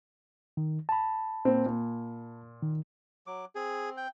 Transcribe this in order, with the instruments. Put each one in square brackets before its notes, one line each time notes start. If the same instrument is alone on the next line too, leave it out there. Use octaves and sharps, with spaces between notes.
[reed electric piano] D#3
A5 B5
[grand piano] A#2 C4
A#2
[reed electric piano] D#3
[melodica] F#3 D6
[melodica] C4 [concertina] G#4
[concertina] G5